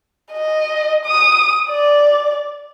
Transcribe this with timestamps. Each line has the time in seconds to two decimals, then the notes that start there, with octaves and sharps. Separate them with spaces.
0.32 D#5
1.06 D#6
1.70 D5